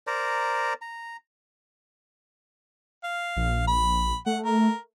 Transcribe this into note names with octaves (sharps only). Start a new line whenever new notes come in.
A#4 C5 D5 A#5
A#5
F5
A#1
B5
A3 F#5
A#4